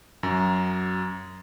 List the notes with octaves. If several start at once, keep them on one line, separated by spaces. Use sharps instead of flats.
F#2 F#3